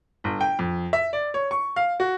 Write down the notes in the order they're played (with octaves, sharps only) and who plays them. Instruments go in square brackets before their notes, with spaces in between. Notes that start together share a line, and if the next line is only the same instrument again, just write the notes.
[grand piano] G1
G5
F2
E5
D5
C#5
C#6
F5
F#4